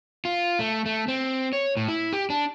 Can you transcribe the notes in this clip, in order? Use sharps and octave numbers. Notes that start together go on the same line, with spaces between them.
F4
A3
A3
C4
C#5
A2
E4
G4
D4